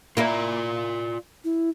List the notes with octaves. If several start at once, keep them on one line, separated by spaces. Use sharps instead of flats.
A#3 E4 F4 D5
E4